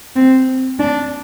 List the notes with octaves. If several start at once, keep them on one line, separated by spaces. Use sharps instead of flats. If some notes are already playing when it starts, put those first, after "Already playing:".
C4
D4